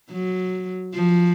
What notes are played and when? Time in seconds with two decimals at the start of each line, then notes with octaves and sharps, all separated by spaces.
0.12 F#3
0.94 F3